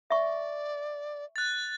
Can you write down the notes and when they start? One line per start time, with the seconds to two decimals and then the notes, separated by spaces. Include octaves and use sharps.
0.10 D5 E5 C#6
1.36 F#6 A6